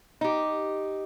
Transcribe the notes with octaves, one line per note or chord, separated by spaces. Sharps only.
D#4 G4